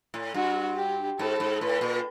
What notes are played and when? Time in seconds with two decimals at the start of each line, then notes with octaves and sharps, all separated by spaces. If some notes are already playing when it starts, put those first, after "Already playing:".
0.14 A2
0.34 G2 F#4
0.76 G4
1.19 G#2 A4
1.40 G#2
1.61 A2 B4
1.81 A#2